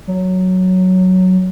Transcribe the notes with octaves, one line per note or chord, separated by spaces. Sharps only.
F#3